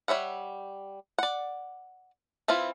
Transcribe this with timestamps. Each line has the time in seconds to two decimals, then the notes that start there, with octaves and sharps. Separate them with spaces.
0.08 G3 C#5 E5 F#5
1.18 D5 F#5
2.48 E3 C4 E4 F4